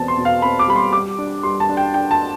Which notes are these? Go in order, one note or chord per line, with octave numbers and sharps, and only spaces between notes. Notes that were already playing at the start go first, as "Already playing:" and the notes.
Already playing: E2 B2 C4 A5
C6
B2
F5
C4 B5
D6
G3 B5
C6
G3 D6
D4
G3 C6
A5
D4
G5
D4 G5
A5